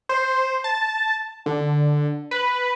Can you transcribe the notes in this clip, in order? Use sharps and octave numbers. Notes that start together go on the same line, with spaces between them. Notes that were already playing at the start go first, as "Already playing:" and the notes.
C5
A5
D3
B4